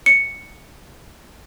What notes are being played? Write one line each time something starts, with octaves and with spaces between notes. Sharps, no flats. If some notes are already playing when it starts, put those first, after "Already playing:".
C#7